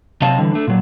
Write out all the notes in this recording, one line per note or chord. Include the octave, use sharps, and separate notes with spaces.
C3 F#3 C4 D#5 F5 A5
D3 E3 G3
A3 D4
A#2 F#3